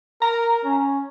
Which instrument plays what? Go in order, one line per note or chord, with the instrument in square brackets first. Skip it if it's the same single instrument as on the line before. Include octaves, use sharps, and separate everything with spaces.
[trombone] A#4 [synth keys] A#5
[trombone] C#4